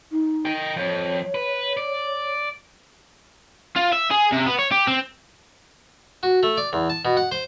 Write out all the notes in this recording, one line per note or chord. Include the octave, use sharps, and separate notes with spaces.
D#4
D#5 G5
F2 C#5
B4
D5
F4
E5
G#4
C3
B3
C#5
G4
C4
F#4
A3
D5
E2
A5
B2
F#5
C5